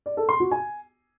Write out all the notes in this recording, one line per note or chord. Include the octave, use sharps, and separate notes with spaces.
D5
A4
C6
F#4
G#5